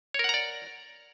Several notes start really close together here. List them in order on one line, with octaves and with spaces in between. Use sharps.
C#5 A#4 F#5 A#5 D5